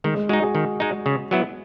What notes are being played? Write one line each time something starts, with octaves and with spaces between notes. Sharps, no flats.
D#3 G#3
G#3
G#3 D#4 F#4
G#4
D#3
G#3 D#4
C#3
F#3 B3 E4